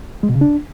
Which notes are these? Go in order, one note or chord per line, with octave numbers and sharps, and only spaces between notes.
G#3
B2
C#3
D4